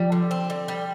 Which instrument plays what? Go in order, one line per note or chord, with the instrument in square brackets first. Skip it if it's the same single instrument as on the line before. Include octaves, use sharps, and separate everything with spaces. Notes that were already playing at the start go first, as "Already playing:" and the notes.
Already playing: [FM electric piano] F3 [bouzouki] G3
[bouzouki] D3
C4
D3
G3